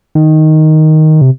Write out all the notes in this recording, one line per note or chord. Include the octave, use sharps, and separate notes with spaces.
D#3
C3